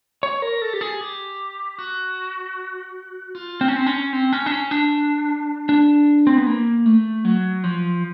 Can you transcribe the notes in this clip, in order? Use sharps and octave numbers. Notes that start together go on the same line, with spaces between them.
C#5
A#4
A4
G4
G#4
G4
F#4
F4
C4
C#4
C4
C#4
C4
C#4
D4
C#4
D4
D4
C4
B3
A#3
A3
F#3
F3